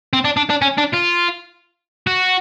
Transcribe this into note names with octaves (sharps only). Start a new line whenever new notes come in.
C4
D4
D4
D4
C#4
D4
F4
F#4